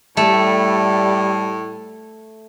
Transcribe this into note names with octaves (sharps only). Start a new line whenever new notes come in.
A2 G3 A3